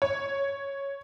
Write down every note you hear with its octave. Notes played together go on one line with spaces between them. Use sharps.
C#5